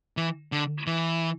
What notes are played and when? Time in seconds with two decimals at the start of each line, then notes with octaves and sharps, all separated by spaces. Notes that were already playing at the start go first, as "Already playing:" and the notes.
0.17 E3
0.52 D3
0.87 E3